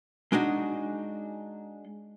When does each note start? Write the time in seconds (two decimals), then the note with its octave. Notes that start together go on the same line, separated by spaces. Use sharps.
0.32 G#3 D4 D#4 F#4